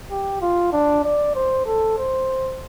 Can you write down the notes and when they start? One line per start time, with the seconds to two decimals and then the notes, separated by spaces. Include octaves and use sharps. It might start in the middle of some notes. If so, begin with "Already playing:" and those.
0.11 G4
0.42 F4
0.73 D4
1.04 D5
1.35 C5
1.65 A4
1.97 C5